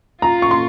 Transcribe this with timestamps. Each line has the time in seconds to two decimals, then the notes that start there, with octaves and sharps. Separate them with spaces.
0.22 F4 A#5
0.42 C#6
0.51 C6